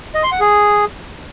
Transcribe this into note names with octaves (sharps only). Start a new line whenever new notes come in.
D#5
C6
F#5
G#4